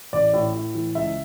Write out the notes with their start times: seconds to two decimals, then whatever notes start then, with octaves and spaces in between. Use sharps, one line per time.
0.13 A1 D5
0.33 A2
0.54 A2
0.75 E3
0.95 C#2 E5